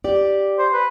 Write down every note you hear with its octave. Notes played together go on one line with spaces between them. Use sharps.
G4 D5
C5
B4